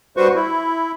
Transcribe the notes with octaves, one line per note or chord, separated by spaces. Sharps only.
G2 G3 F#4 B4 C5 C#6
E4